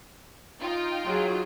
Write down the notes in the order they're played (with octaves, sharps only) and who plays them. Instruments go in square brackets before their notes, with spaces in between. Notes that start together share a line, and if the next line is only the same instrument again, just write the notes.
[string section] D#4 F4 G5
[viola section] F#3 G#4